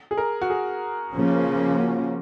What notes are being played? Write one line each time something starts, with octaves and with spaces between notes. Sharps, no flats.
G#4
A#4
F#4
G#4
C#3 F3 A#3 C#4
F4
F#4